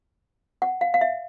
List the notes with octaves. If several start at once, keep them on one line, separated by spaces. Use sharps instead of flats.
F#5
F5
F5
E5